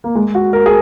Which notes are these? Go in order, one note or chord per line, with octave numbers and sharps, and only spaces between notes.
A#3
G#3
F#4
A#4
G#4